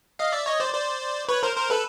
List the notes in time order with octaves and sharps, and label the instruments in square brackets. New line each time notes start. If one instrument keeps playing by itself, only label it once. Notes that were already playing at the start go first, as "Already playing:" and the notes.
[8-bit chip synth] D#5 F5
D5 E5
C#5 D#5
C5 D5
C5 D5
B4 C#5
A#4 C5
A#4 C5
A4 B4